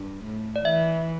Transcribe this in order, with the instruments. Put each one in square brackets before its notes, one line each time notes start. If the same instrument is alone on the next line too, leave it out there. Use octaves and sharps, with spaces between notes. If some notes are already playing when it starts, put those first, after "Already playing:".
Already playing: [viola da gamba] G2
A2
[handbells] D5
[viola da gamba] E3 [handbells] E5